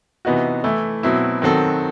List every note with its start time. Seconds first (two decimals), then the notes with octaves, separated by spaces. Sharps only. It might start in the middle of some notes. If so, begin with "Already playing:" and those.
0.25 C3 E3 B3 D#4 F#4
0.64 E3 A3 E4
1.03 B2 F#3 C4 E4
1.42 D#3 F#3 C4 F#4 A4